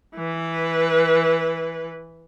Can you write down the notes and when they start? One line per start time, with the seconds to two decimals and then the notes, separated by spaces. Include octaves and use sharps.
0.16 E3 B4